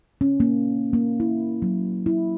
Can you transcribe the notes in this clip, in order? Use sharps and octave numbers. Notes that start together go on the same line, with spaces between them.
C#4
A#3
A#3
E4
F#3
E4